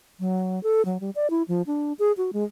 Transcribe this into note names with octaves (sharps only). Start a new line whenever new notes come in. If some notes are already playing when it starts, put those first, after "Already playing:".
F#3
A4
F#3
G3
D5
E4
F3
D4
G#4
F#4
G#3